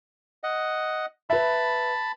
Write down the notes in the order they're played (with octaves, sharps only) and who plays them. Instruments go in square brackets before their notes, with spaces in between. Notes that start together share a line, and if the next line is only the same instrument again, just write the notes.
[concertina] D#5 F#5
[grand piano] B4 E5 [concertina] A5 B5